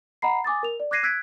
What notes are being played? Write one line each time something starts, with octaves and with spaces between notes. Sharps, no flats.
D#5 F#5 A#5 B5 C7
G#5 D6 D#6 A6
A#4 F7
D5
D6 F#6 G#6 A#6 C7 D#7
E6 F#6 G#6 B6 D7